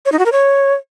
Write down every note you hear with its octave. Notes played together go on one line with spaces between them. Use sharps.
C#5
D#4
F#4
A#4
C#5